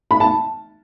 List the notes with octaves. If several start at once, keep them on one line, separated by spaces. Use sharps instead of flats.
B5
A5